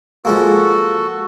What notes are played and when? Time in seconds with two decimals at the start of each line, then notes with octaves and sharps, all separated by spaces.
0.25 F3 G#3 A#3 F#4 A4